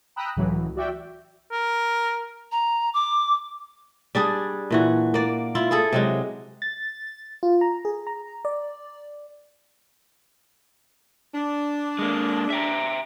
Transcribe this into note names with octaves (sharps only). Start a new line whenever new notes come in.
G5 A#5 B5 D#6 E6 F#6
C#2 A2 E3 F#3
F#4 D5 E5 G5
A#4
A#5
D6
G3 D4 G#4
A#2 E3 F#4
A#3 D5
E4 F4
E4 G#4 A4
C3 F#3 G#3
A6
F4
A#5
G#4
A#5
D5
D4
G#3 A#3
E5 G5 A#5